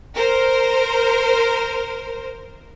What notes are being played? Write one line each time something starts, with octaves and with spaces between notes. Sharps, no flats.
A#4 C5